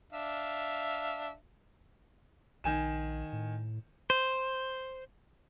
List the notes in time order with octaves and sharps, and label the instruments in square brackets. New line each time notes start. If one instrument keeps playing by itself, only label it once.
[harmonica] D4 E5 F5
[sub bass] A#1 [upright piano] D#3 G#5 E7
[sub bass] A2
[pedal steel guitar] C5